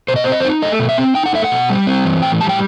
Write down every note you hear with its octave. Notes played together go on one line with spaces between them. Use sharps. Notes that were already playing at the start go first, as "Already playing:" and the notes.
B2 C5
D#5
C4 C5
D#5
C5
D#4
A3 D#5
B2
E5
C4
D#4 G5
F#5
A3 E5
F#5
B2
G3
C4
E3
A2 G5
G3 A5
G5